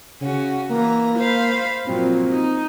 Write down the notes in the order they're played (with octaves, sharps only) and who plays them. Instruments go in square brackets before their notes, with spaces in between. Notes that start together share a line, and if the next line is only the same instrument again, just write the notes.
[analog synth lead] C#3 [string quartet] C#4 F#4
[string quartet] E3 A#5 [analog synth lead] A#3
[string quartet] C5 F5 B5
[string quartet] A#2 F3 F#3 [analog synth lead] C4
[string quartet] D#4